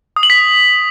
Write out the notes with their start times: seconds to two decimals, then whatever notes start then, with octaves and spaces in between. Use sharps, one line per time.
0.16 D#6
0.23 F#7
0.30 B6